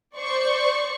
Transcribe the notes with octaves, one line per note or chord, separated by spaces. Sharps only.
C5 D5 C#6